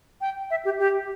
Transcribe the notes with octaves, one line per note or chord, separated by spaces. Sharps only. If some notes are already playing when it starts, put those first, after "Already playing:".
G5
E5
G4
G4